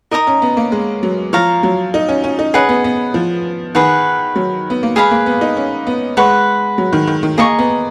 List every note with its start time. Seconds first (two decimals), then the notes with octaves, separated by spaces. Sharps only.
0.11 D#4 A#4 D#5 A#5 D#6
0.27 C#4
0.42 B3
0.57 A#3
0.72 G#3
1.03 F#3
1.33 F3 C#5 F5 A#5
1.63 F#3
1.94 D#4
2.09 C#4
2.24 C#4
2.39 D#4
2.54 C#4 G#4 B4 D#5 F#5
2.69 B3
2.84 B3
3.14 F3
3.75 D#3 G#4 B4 F#5
4.36 F#3
4.70 B3
4.83 A#3
4.96 G#3 G#4 B4 F5 B5
5.11 A#3
5.26 B3
5.41 D#4
5.57 C#4
5.87 B3
6.17 G#3 B4 F#5 C#6
6.78 F#3
6.93 D#3
7.07 D#3
7.23 D#3
7.38 A#3 G#4 D#5 A#5 C#6
7.59 B3